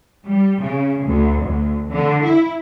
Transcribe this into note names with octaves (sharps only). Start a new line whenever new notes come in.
G3
C#3
D2
D2
D3
E4